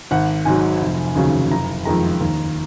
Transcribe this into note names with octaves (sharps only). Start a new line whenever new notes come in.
G#1 F#5
G#2 F#3 G#5
F1
D#2 C#3 F#3
F#1 A#5
F2 D#3 G#3 A#5
D#2